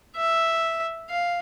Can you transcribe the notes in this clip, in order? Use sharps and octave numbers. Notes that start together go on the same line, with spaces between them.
E5
F5